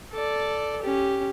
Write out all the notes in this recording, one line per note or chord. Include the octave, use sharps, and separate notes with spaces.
A4 D5
C#4 G4